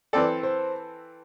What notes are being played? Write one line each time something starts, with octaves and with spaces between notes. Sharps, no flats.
E3 C4 A4 D5
C5